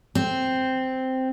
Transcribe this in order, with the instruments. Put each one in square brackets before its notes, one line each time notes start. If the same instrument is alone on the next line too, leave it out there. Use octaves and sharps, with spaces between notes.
[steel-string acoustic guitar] C4